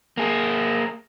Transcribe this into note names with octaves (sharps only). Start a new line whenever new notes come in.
A#3 G#4